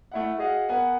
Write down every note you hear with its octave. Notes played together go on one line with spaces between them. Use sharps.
A3 E4 F#5
F#4 G#4 D#5 F5 F#5
B3 A#4 F#5 G#5